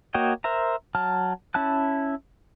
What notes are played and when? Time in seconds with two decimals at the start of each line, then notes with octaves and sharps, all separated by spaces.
0.14 A#3 F#4 C#5 D#5 G5
0.44 A#4 C5 E5 A#5
0.95 F#3 A5 F6
1.54 C#4 E4 A5 F#6